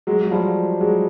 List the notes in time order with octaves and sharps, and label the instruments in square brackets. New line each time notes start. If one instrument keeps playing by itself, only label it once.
[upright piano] F#3 G#3
F#3
F3 G3
F#3 G#3